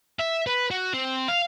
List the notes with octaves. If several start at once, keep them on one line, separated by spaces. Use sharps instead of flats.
E5
B4
F#4
C4
F5